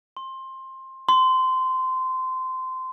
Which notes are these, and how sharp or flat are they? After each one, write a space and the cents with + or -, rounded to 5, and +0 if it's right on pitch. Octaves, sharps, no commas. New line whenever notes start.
C6 +20
C6 -20